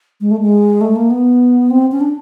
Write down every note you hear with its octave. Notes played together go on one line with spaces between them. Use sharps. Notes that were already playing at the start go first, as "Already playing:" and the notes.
G#3
A3
G#3
A3
A#3
B3
C4
C#4
D4